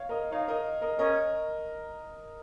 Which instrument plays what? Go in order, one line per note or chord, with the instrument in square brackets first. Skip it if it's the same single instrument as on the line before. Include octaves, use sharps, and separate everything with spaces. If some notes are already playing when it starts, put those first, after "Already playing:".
Already playing: [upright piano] C#5 F5
A#4 D#5
[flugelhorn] D#4 [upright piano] C#5 F5
[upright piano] A#4 D#5
A#4 D#5
[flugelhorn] C#4 [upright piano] A#4 D#5